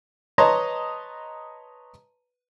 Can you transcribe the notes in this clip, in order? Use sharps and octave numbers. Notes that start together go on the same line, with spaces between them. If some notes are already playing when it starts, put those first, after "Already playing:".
B4 C#5 D#5 A5 A#5 C6